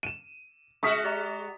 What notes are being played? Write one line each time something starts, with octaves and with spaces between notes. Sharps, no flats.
D#7 E7
G#3 F#4 E5 C#6 D#6 F6 B6
G4 D5 A#5